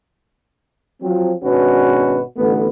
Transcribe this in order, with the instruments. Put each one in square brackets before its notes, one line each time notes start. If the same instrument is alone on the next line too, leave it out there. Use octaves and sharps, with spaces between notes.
[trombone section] F3 F#3 C4
G#1 B2 C#4 D4 F#4 B4
A1 D3 A3 B3